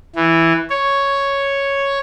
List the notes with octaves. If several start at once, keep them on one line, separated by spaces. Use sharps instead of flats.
E3
C#5